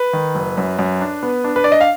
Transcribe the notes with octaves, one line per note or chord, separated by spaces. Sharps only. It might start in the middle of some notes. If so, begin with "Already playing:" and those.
Already playing: B4
D#3
F#1
F#2
F#2
D4
B3
D4
B4
D4 D5
D#5
F5